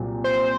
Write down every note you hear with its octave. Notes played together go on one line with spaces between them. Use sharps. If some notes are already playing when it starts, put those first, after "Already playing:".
Already playing: C2 A#2 F#3 C4
C5